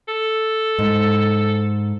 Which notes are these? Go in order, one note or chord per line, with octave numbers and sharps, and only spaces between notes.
A4
G#2